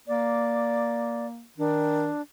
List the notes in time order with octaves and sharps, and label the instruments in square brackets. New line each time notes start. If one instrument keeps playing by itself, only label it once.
[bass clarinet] A#3 [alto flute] D5
[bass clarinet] D#3 [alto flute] D4